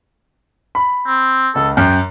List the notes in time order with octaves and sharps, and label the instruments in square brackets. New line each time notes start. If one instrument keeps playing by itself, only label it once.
[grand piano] B5
[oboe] C4
[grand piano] C#2 [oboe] A4
[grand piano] F#2 [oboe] G5